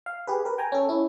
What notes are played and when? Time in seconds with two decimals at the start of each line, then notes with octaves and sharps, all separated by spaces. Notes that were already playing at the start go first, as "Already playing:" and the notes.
0.06 F5
0.27 G4 G#4 B4
0.45 A#4 B4
0.58 G5 G#5 A#5
0.72 C#4 A4
0.89 C#4 E4